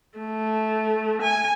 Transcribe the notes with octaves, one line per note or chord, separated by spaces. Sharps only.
A3
G#5